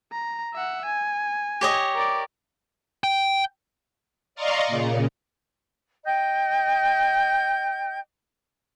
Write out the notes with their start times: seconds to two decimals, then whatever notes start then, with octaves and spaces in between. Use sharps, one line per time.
0.12 A#5
0.54 E5 F#5
0.85 G#5
1.61 G4 C#5 D#5
1.95 A#4 D5
3.04 G5
4.35 D5 D#5 F5 A#5 C6 C#6
4.67 A#2 C#3
6.05 D#5 G5 G6